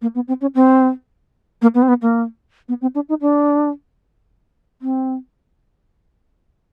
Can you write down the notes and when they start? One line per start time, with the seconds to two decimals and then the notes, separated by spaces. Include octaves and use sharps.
0.02 A#3
0.15 B3
0.28 C4
0.41 C#4
0.55 C4
1.62 A#3
1.74 B3
1.82 C4
1.88 B3
2.02 A#3
2.69 B3
2.81 C4
2.95 D4
3.09 D#4
3.21 D4
4.82 C4